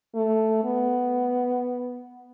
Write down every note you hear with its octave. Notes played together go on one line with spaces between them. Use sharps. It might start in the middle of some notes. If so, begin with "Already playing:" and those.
A3
B3